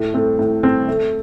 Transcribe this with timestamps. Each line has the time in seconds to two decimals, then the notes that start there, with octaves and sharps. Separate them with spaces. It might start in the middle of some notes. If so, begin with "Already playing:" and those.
Already playing: A2
0.14 A3 C4 A4
0.39 A2
0.63 A3 C4 A4
0.88 A3